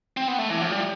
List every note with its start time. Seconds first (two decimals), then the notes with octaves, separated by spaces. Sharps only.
0.17 C4
0.28 B3
0.38 A3
0.50 E3
0.61 F3
0.72 G3